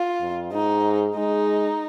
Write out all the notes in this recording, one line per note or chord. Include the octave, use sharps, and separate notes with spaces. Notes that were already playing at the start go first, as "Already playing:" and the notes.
Already playing: F4
F2
G#2 D#4
G#3 D#4